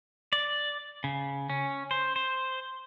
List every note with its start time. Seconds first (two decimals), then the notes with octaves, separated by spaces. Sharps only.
0.33 D5
1.04 C#3
1.50 C#4
1.91 C5
2.16 C5